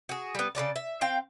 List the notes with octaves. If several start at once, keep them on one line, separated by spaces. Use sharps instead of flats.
F#4 G#4
G3 B3
C#3 C4 D5 A5
E5
C4 F5 G5